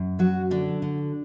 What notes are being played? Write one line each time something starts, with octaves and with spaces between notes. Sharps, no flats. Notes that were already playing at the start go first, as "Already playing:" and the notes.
Already playing: F#2
F#3 F#4
D3 D4
D3